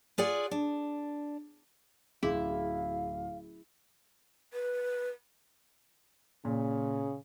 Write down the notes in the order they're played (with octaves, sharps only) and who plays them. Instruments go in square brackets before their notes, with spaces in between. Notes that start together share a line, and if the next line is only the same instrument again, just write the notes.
[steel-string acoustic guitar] F4 G#4 D5 F#5
D4
[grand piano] D1 [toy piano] C#4 F#4 G#4 [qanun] E4 [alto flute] F5
[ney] B4
[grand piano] A#2 [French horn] C#3